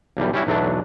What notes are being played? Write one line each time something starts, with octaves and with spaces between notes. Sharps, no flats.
B1 E2 G3
G3 C#4 E4 F#4
B1 E2 F#3 A3 D4